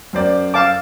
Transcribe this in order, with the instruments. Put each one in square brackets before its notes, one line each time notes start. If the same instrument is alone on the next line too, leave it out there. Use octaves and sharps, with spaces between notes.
[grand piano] F#2 C5 D5
[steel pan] F5 A5 D6